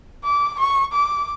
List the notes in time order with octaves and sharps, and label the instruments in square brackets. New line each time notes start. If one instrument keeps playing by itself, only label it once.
[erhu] D6
C#6
D6